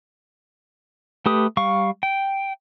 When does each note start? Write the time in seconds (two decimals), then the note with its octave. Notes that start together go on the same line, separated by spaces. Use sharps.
1.26 A3 G4 B4 D#6
1.57 G3 F5 C#6
2.03 G5